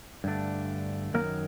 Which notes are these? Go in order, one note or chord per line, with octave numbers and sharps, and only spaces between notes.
G2 D3 A3 D4
F#2 D#3 F#3 A#3 D#4 A#4